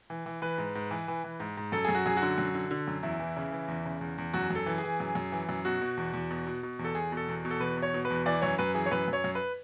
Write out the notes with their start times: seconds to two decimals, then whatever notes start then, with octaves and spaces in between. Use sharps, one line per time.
0.10 E3
0.26 E3
0.42 E3 B4
0.58 G#2
0.75 G#2
0.91 E3
1.08 E3
1.24 E3
1.40 G#2
1.57 G#2
1.72 F#2 A4
1.85 F#2 G#4
1.95 F#4
2.06 F#2 G#4
2.17 F#4
2.22 D3
2.38 F#2
2.54 D3
2.71 D3
2.88 F#2
3.03 E2 E4
3.20 E3
3.37 C#3
3.52 E3
3.68 E2
3.85 C#3
4.01 E2
4.18 E2
4.34 F#2 F#4
4.50 F#2 A4
4.66 E3
4.78 G#4
4.84 E3
5.00 F#2
5.15 F#2
5.32 E3
5.49 F#2
5.65 B2 F#4
5.81 B2
5.97 E2
6.13 E2
6.31 B2
6.47 B2
6.63 B2
6.79 E2
6.84 A4
6.95 E2 G#4
7.12 B2 A4
7.29 E2
7.45 B2
7.51 A4
7.60 E2 B4
7.77 B2
7.82 C#5
7.94 B2
8.05 B4
8.10 E2
8.26 E3 D5
8.42 F#2 C#5
8.58 F#2 B4
8.74 E3 G#4
8.86 C#5
8.91 F#2 B4
9.08 F#2
9.13 C#5
9.24 F#2
9.35 B4